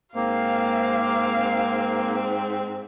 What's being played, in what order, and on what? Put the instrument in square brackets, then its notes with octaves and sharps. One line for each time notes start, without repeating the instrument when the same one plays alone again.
[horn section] G#2 C4 [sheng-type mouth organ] A#3 [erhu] F5